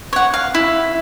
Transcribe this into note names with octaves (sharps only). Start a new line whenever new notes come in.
C#5 F#5
F5
E4